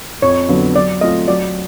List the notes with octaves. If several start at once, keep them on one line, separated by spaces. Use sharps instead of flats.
F2 C#5
D3 F#3 B3
F#3 D5
A3 C4 F4 D#5
F#3 D5